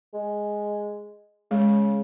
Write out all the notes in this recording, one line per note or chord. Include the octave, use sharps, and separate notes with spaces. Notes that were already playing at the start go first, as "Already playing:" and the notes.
G#3
C#3 G#3